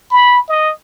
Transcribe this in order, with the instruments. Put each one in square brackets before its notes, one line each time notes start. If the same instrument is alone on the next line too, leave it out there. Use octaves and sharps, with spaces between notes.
[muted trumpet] B5
D#5